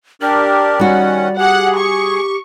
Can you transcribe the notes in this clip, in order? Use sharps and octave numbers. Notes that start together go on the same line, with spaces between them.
D4 G4 A#4 D5
D#3 G3 C#4 F#4 F#5
G4 G#4 F#5
C#6